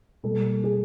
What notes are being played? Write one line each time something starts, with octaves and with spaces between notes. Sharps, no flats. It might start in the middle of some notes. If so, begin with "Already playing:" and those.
B2 G3 A#3 A4
G#4